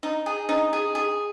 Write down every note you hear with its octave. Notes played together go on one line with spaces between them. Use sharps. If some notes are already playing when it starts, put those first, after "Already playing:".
D#4
G#4
D#4
G#4
G#4